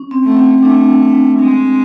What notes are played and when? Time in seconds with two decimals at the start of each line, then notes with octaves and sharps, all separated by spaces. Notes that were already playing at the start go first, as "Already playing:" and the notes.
Already playing: C#4
0.11 C4
0.24 A3
0.37 C4
0.62 A3 D4
1.39 G#3 C4